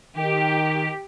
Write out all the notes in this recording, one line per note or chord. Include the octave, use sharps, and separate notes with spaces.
D#3 G4